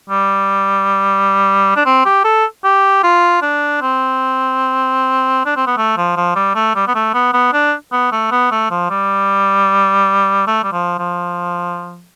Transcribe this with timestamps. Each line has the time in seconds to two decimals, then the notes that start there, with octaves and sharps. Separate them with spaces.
0.09 G3
1.76 D4
1.86 C4
2.05 G4
2.24 A4
2.64 G4
3.04 F4
3.42 D4
3.81 C4
5.46 D4
5.56 C4
5.67 B3
5.77 A3
5.97 F3
6.17 F3
6.36 G3
6.55 A3
6.75 G3
6.88 B3
6.95 A3
7.14 B3
7.33 B3
7.53 D4
7.92 B3
8.12 A3
8.31 B3
8.51 A3
8.71 F3
8.90 G3
10.47 A3
10.63 G3
10.72 F3
10.99 F3